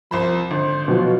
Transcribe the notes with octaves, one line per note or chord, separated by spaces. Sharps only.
C2 F3 C5 B5
G#1 D3 C5
B2 F3 F#3 F4